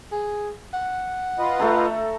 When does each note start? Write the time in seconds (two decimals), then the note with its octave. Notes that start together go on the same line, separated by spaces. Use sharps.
0.12 G#4
0.74 F#5
1.39 F4 B4 D#5
1.59 A3 A4 A#5